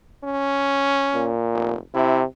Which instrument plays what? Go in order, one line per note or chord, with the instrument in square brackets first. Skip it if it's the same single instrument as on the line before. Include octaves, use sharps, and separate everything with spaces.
[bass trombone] C#4
[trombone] A#2
[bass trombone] F1
[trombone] C3 [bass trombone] E4